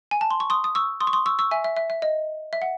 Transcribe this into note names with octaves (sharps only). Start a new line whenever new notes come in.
G#5
A5
C6
C#6
C6 D#6
D#6
C#6 E6
C6 D#6
C#6
C6 D#6
C#6 E6
C#6 E6
E5 G#5
E5
E5
E5
D#5
E5
F#5